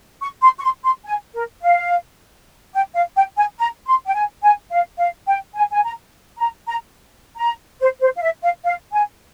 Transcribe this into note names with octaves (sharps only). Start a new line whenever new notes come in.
C#6
C6
C#6
C6
C6
G#5
A#4
F5
G5
F5
G5
G#5
A#5
C6
G5
G#5
G#5
F5
F5
G5
G#5
G#5
A#5
A#5
A#5
A#5
C5
C5
F5
E5
F5
F5
G#5